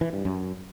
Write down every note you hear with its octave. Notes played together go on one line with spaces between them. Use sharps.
E3
G2
F#2